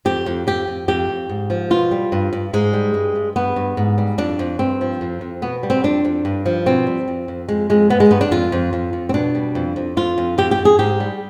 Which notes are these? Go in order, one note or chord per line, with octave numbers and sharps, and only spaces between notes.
F2 G4
F2
F2 G4
F2
F2 G4
F2
G#2
F3
B2 F4
G3
G2
G2
G#2 G#3
G3
G2
G2
G2 B3
G2
G#2
G3
F2 D4
F2
G2 C4
F3
F2
F2
B2 B3
G3
C4
F2 D4
F2
G2
F3
B2 C4
G3
F2
F2
F2 G#3
F2 G#3
G2 B3
G#3
G2 B3
D4
F2 F4
F2
F2
F2
C4
B2 D4
G3
F2
F2
F2 F4
F2
F2 G4
G4
F2
G#4
G#2 G4
G3